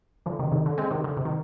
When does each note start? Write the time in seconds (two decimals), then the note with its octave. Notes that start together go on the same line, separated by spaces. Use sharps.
0.26 D3 F3
0.39 C3 D#3
0.52 C3 D#3
0.66 D3
0.78 G#3 C4
0.91 C3 D#3
1.04 D3
1.17 C3
1.25 D#3